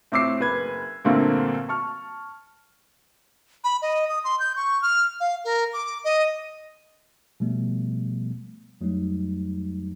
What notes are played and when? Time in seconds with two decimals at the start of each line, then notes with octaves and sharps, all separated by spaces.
0.12 A2 C4 D6 E6 C7
0.39 F#1 B4 G#6
1.05 G2 A#2 D3 A3 A#3 C4
1.68 A5 C#6 F6
3.64 B5
3.82 D#5
4.09 D#6
4.24 C6
4.40 G6
4.56 C#6
4.82 F6
5.20 F5
5.45 A#4
5.73 D6
6.04 D#5
7.40 B2 F3 G3 A3 B3
8.81 F2 F#3 G3 A3 D#4